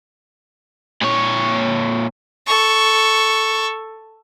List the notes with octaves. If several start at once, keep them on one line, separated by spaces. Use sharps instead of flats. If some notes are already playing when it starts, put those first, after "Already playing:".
A#2 C#5
A4 C#6